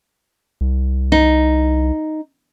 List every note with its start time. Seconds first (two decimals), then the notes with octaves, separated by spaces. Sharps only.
0.61 C2
1.12 D#4